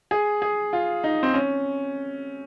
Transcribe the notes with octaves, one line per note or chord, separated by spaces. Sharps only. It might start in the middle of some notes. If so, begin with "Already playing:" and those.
G#4
G#4
F4
D#4
C4
C#4